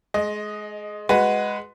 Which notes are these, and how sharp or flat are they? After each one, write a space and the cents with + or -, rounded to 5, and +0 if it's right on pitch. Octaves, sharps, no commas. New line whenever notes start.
G#3 +25 D#5 +0
G#3 +0 F#4 +0 B4 +10